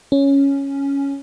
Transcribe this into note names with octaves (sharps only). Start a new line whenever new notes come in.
C#4